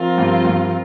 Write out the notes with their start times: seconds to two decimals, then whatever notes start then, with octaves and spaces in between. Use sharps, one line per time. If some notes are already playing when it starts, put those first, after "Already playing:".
Already playing: F3 C4 F4 A#4
0.18 G2
0.45 G2